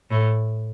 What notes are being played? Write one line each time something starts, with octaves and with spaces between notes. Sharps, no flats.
A2